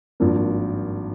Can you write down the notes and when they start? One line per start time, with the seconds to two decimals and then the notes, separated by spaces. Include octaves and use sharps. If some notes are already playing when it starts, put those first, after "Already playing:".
0.20 G#1 G2 F3 A#3